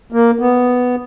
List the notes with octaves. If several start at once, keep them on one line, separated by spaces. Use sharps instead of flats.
A#3
B3